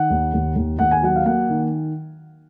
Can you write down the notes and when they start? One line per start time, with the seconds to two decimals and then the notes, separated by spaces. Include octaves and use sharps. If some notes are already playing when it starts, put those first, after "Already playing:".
Already playing: D#3 F#5
0.10 D#2
0.33 D#2
0.55 D#2
0.79 D#2 F#5
0.91 G#5
1.03 F#3 F#5
1.16 F5
1.25 A#3 F#5
1.49 D#3